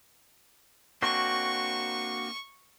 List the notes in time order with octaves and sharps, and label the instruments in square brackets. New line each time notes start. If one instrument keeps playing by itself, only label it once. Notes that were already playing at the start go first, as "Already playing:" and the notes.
[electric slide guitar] A#3 C4 D4 [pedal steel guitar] F#4 [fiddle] C#6